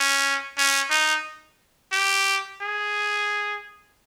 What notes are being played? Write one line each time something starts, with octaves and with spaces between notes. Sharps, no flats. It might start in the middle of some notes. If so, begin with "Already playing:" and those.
Already playing: C#4
C#4
D#4
G4
G#4